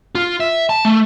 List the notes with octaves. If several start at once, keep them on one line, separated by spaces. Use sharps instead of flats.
F4
E5
A5
A3